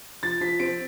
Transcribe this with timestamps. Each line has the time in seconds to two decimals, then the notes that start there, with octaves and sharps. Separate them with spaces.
0.23 F3 A6
0.41 F3 B6
0.59 C4 D7